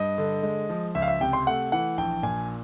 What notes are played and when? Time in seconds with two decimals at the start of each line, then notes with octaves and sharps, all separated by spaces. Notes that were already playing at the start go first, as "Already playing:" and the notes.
Already playing: G2 D#5
0.18 D3
0.43 G#3
0.69 F3
0.95 C#2 E5
1.02 F5
1.08 E5
1.21 C3 G5
1.33 C6
1.47 A3 F#5
1.72 E3 F#5
1.98 A#1 G5
2.23 A#2 G#5